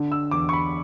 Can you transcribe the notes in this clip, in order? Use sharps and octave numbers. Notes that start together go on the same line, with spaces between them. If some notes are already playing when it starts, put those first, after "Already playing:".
Already playing: D3
E6
E2 D6
C#6
B5